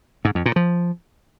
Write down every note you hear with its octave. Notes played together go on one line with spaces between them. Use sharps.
G#2
F2
A#2
F3